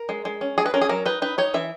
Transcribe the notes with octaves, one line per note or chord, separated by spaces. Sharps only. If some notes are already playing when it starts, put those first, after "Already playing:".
Already playing: A#4
G#3
G#3
C#4
G#3 G#4
B4
C#4 A#4
G#4
F#3 A#4
D#4 B4
D#4 B4
D#4 C#5
E3 E5